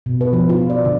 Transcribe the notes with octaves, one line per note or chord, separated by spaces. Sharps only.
B2
B4
F3
F4
D5
D3